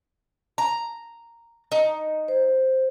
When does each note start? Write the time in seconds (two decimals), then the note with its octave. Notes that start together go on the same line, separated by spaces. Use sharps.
0.58 A#5
1.72 D#4
2.28 C5